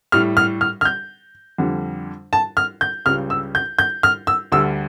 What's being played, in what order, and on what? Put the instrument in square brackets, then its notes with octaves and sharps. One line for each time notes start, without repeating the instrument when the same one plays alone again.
[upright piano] A2 G3 F6
F6
F6
F6
G6
F2 D3 G3
A5
F6
G6
C#2 C#3 G3 F6
E6
G6
G6
F6
E6
D2 D3 G3 E6